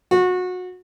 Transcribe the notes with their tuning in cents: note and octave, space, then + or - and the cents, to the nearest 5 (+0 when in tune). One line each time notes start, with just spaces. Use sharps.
F#4 -25